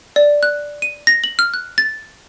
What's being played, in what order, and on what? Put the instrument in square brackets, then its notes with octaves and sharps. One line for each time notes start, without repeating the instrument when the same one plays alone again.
[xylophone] D5
F#6
D#7
A#6
F#7
F6
F#6
A6